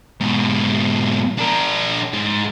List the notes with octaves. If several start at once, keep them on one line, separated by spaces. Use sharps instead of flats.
G#2 B2
D4 A#4
G#2